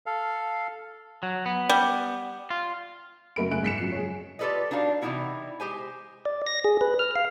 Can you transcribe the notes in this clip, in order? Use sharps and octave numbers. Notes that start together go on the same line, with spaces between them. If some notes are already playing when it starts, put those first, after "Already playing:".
A4 F5
F#3
B3
G3
F4
F#1 F#2 A3 A#4 B5 D7
C#3 A3 G#4 F#6 D7
G#2 B6 C#7 E7
F#2 F3 C7
G#4 C#5
F4 G4 A4 B4 D5 D#5
D4 D#4 F#4 F5
C3 E3 G#3 D#4 E4 F#4
G#3 G4 C5 G#5
D5
A#6
G#4
B4
F6
F5